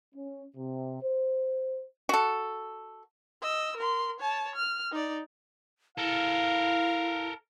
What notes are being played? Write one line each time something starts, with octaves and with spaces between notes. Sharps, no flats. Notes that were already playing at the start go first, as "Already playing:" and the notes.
C#4
C3
C5
F#4 A4
D#5 E6
A#4 C6
C#5 A5
F6
D#4 D5
E4 A4 A#4 F5